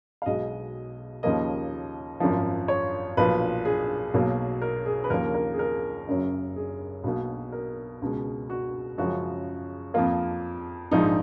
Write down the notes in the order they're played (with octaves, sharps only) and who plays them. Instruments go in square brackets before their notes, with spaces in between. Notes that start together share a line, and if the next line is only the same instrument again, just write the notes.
[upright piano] F5
B1 B2 G#3 D#5
D#2 C#3 F3 A#3 D#5
G#1 F#2 F3
C#5
B1 A#2 F3 B4
G#4
B1 B2 F#3 A#3
A#4
G#4
B4
D#2 C#3 F3 A#3 A#4
A#4
G#4
A#4
F#1 F#2 C#3 F#3
G#4
B1 B2 A#3
A#4
C#2 B2 G#3
F#4
F#2 C#3 F3 G#3 F#4
F2 F3 A#3 F4
A#1 G#2 F3 D#4